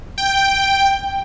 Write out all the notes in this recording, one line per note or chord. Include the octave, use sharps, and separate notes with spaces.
G5